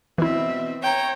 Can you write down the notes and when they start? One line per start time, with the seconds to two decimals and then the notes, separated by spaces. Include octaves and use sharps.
0.18 B2 E3 C4 E4 E5
0.82 C#5 G5 A#5